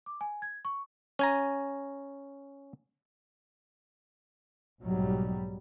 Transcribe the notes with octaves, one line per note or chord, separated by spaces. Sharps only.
D6
G#5
G#6
C#6
C#4 G#5 A#5
B1 G#2 F#3 G3